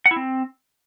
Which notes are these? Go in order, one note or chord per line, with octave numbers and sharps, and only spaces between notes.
F#5
E4
C4